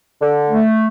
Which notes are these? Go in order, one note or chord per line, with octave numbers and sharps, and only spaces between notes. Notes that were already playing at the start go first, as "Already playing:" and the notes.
D3
A3